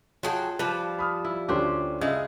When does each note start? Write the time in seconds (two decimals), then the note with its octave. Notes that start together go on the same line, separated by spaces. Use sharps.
0.23 F#3 F4 G#4 G5
0.59 F3 G3 B4
0.98 B5 D#6 F6
1.25 E4
1.49 D2 C#4 D4 F4 G4 C5
2.01 C#3 G#3 E5 G#6